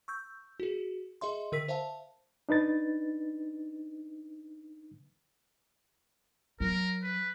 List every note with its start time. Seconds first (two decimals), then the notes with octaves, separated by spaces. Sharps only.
0.08 C#6 E6 G6
0.60 F#4 G#4
1.21 G#4 D#5 E5 C6
1.52 D3 A#4 E6 B6
1.68 C5 E5 F5 A5
2.49 D4 D#4 B4 A6
6.60 F#3 A#4
7.03 B4